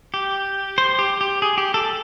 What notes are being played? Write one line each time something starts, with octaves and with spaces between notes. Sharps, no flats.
G4
C5
G4
G4
G#4
G4
A4